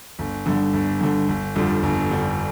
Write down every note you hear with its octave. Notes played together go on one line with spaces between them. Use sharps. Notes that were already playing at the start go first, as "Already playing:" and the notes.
G1
G2 D3
G1
G2 D3
G1
F2 D3 G3
G1
F2 D3 G3